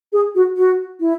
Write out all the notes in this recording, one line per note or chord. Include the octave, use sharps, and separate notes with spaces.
G#4
F#4
F#4
E4